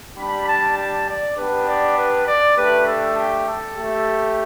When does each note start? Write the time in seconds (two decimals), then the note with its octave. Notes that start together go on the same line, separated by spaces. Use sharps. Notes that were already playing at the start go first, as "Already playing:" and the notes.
0.17 G3 D4 G4 B5
0.47 A5
0.76 A5
1.07 D5
1.37 B3 D4 G4 B4
1.66 D5
1.97 B4
2.26 D5
2.55 A3 D4 G4 B4
2.85 A4
3.15 G4
3.45 A4
3.75 A3 G4